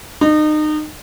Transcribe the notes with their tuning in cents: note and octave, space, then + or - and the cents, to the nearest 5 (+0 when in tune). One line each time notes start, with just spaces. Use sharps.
D#4 -30